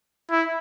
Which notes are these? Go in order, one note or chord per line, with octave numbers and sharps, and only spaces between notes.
E4